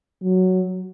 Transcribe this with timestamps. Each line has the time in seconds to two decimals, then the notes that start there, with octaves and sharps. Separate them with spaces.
0.23 F#3